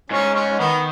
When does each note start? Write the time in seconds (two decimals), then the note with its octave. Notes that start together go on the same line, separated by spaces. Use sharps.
0.10 G#2 C#4
0.35 C#4
0.59 D#3 B3